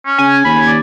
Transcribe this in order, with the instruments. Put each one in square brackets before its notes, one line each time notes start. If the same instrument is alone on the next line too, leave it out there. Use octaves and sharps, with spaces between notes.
[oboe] C#4
[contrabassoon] C#3 [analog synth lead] G#5
[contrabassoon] D#2 [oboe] B5
[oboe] D5